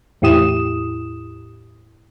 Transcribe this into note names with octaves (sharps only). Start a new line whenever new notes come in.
E2 A2 E4 G4 D#6 E7